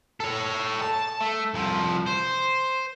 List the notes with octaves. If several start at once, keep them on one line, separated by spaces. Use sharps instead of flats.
A4 C#5
A5
A3
C2 F3
C5